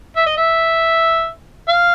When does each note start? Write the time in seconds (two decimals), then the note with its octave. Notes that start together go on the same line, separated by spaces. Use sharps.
0.17 E5
0.26 D#5
0.38 E5
1.69 F5